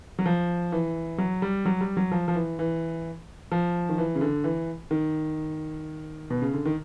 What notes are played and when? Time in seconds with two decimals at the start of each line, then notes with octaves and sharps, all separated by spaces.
0.19 F#3
0.26 F3
0.72 E3
1.18 F#3
1.42 G3
1.65 F#3
1.81 G3
1.97 F#3
2.12 F3
2.28 F3
2.35 E3
2.59 E3
3.52 F3
3.89 D#3
3.98 E3
4.15 C#3
4.21 D3
4.44 E3
4.91 D#3
6.30 B2
6.42 C#3
6.54 D3
6.65 D#3